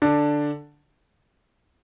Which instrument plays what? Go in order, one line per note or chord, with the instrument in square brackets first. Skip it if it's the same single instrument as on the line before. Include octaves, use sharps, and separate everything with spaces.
[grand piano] D3 D4